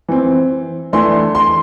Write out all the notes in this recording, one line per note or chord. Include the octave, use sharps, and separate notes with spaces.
E3 C4
E3 A3 D4 C6
C6